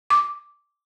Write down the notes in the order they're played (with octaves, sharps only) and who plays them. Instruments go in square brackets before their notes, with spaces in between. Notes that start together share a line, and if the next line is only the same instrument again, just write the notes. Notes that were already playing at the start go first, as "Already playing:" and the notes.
[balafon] D6